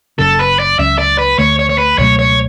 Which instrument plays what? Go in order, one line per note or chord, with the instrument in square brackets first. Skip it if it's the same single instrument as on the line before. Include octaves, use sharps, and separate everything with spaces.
[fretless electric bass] F#1 F#2 C#3 [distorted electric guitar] A4
[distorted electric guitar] B4
D5
[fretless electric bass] C#2 C#3 F#3 C#4 [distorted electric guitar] E5
[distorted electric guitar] D5
B4
[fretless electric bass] D2 D3 A3 [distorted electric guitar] C#5
[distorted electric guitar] C#5
C#5
B4
[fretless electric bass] C#2 B2 F#3 A3 [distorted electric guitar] C#5
[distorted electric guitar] C#5